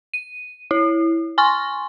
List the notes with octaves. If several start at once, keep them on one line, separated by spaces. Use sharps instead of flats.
D#7
E4
G#5 C6 C#6